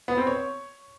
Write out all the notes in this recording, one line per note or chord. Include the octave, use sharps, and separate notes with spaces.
B3
C4
C#5